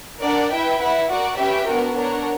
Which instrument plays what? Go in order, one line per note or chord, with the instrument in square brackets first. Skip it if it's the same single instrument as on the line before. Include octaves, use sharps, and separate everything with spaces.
[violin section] D4 A#4 D5 F#5
E4 B4 E5 G5
E4 B4 F#5
F#4 A#4 D5 F#5
C#4 G4 B4 E5 G5
B3 D4 F#4 A#4
D4 A#4 C#5 F#5